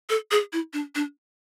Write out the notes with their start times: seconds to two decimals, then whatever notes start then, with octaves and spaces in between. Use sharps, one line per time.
0.10 A4
0.31 G#4
0.53 E4
0.73 D4
0.95 D4